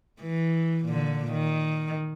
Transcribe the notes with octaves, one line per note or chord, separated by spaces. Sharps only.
E3
A#2 D3
D#3